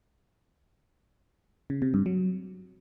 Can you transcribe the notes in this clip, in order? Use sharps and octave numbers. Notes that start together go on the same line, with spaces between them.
C#3
C3
G2
F#3